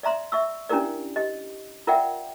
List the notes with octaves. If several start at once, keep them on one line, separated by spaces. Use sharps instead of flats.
D5 E5 A#5 C6
E5 C#6 E6
C#4 D4 E4 G4 A#4 D5
G4 D#5
F4 A#4 D5 E5 F#5 G5